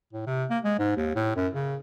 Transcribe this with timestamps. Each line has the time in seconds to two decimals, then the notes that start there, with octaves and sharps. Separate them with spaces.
0.13 A2
0.27 C3
0.50 A#3
0.64 G#3
0.79 G#2
0.96 D#2
1.15 A2
1.36 F#2
1.54 C#3